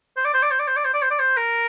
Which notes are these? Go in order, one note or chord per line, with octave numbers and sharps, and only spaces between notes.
C5
D5
C5
D5
C5
D5
C5
D5
C5
D5
C5
D5
C5
A#4